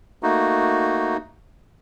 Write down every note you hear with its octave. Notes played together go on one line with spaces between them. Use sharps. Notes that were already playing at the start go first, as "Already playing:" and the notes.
A3 A#3 D#4 F#4